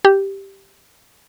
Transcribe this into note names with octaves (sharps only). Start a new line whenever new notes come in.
G4